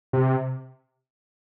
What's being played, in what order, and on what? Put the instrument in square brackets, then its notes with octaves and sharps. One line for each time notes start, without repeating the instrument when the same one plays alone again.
[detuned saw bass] C3